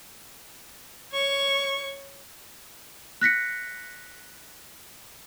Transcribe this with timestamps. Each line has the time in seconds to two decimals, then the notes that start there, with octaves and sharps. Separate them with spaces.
1.12 C#5 C#6
3.21 F#6 A#6 B6 C#7